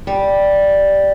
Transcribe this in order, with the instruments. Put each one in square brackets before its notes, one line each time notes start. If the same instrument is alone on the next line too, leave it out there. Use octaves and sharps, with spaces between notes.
[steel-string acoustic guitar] G3